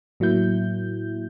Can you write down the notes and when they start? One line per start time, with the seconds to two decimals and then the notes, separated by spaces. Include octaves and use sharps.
0.20 A2 F#3 A#3 E4 G6